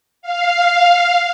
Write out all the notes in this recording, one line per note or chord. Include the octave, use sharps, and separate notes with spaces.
F5